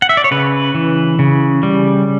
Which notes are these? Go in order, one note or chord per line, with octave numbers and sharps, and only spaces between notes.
F#5
E5
D5
C#5
C#3 B4
E3
C#3
G3